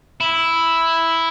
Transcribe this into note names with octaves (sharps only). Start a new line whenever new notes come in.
E4